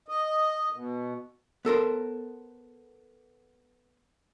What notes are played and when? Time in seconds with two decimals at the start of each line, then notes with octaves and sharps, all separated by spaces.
0.08 D#5
0.72 B2
1.65 B3 A4 A#4 C5